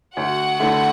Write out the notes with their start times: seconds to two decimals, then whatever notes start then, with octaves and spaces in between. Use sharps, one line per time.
0.17 D2 F#4 F#5
0.59 D3 A3 E4 A4